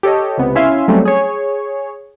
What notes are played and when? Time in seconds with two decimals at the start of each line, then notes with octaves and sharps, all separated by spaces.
0.03 G4 A4 C#5 D#5
0.38 C#2 C3 B3
0.55 C#4 E4 E5 F5 G#5 C6
0.88 F#3 G3 A3 C4 C#4
1.05 G#4 C#5